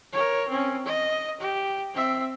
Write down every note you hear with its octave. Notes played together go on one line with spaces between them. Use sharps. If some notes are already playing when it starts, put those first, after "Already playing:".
A#4 C#5
C4 C#4
D#5
G4
C4 E5